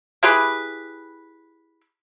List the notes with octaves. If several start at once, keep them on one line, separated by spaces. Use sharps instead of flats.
E4 G4 G#4 B4